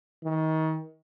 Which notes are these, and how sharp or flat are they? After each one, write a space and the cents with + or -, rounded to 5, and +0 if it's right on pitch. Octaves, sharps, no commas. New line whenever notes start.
D#3 +30